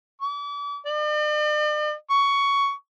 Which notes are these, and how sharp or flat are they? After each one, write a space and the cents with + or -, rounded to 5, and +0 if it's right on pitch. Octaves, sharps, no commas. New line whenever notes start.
D6 -40
D5 +45
C#6 +15